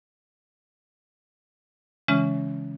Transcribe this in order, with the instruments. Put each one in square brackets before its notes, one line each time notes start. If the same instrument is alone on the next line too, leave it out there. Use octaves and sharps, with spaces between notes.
[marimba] C#3 E3 G#3 C#4